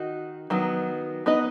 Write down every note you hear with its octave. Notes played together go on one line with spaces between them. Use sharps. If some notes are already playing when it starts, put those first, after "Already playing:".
Already playing: D#3 D#4 F#4
D#3 F#3 B3
B3 D#4 B4 D#5